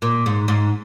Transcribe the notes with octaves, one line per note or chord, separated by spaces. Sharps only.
A#2
G#2
G#2